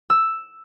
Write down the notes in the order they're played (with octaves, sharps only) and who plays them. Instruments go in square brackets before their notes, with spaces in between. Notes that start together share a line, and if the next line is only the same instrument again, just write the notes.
[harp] E6